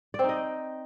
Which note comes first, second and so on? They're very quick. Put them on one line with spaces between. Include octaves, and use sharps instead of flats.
D5 C4 D#4 D#5